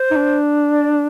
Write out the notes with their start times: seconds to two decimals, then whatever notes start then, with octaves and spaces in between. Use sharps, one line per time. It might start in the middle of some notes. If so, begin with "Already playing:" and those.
Already playing: C5
0.11 D#4
0.16 D4
0.70 D5